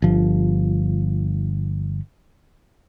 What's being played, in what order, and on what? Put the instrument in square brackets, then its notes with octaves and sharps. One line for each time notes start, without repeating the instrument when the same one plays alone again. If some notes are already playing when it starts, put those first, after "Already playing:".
[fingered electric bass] G1 F3